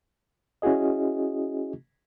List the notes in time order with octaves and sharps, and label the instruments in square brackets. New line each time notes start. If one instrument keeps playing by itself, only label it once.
[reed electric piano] C#4 E4 F#4 G#4 D#5